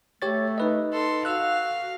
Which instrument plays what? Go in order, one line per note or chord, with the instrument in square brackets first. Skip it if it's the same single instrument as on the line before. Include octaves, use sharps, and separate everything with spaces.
[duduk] A3 [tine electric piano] G4 C#5 A6
[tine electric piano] D#4 B4 D#5
[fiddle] A4 C6
[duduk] F#4 [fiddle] F5 [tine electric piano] E6 F#6